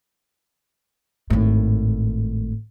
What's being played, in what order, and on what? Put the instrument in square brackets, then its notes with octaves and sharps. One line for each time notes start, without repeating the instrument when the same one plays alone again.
[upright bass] G#1 A2